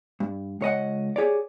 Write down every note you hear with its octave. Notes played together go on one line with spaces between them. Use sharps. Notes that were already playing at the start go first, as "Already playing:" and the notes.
G2
C#2 C#5 D#5 F#5
G4 G#4 C#5 D5